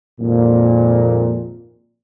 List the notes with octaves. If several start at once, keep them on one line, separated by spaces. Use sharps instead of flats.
G#1 F2 A#2